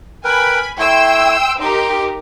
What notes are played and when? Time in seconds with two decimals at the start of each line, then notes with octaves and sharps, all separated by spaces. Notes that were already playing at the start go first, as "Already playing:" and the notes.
0.24 A#4 B4 G5 G#5 B5
0.78 A3 E4 G5 C6 E6
1.61 D#4 G4 A#4 G5 C6